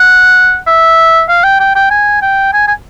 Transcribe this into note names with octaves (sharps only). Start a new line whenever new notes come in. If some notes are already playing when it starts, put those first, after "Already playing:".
Already playing: F#5
E5
F5
G5
G5
G5
G#5
G5
G#5
G#5